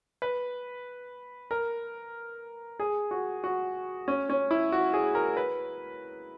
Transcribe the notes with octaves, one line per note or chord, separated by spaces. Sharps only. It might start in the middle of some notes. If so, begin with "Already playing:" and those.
B4
A#4
G#4
F#4
F#4
C#4
C#4
E4
F#4
G#4
A#4
B4